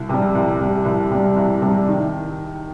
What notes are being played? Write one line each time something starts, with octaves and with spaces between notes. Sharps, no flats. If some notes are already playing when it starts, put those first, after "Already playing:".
Already playing: C2
C3 G3
C2
C3 G3
C2
C3 G3
C2
C3 G3
D#3